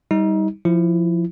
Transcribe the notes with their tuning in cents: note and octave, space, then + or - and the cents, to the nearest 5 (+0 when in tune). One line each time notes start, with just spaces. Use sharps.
G3 +0 D#4 +30
F3 +0 E4 +15